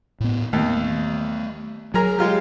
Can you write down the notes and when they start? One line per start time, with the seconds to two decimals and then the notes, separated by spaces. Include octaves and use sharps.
0.20 A2 B3
0.53 D#2 A3 B3
1.94 F#3 G#4 A#4 A#5
2.18 G#3 F4 G4